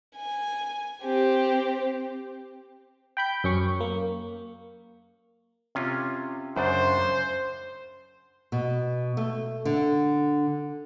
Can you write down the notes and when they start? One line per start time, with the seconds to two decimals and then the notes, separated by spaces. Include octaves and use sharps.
0.16 G#5
1.04 C4 G4
3.17 G5 B5 G6
3.44 F#2 C#4 C#6
3.80 A#3
5.75 C3 C#4 F4
6.56 F#2 C#3 D4 C5
8.52 B2
9.17 A3
9.65 D3